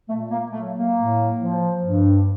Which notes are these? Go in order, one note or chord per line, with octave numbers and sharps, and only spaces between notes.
A#2 A3
A#3
F#3 A3
A#3
A2
F3
G2